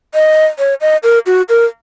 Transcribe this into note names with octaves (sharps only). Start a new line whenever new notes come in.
D#5
C#5
D#5
A#4
F#4
A#4